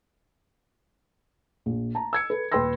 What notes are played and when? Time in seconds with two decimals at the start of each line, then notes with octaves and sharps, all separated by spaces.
1.66 A#1
1.95 A5 A#5
2.13 E6 G#6 C#7
2.30 A4 B4
2.52 D#1 B4 G5 C6 E6 A#6